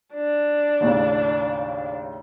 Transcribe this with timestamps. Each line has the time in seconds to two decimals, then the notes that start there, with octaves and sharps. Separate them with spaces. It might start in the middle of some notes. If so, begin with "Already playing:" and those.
0.15 D4
0.80 D#2 A2 C#3